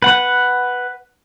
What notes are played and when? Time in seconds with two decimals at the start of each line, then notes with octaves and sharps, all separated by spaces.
0.02 B4 F#5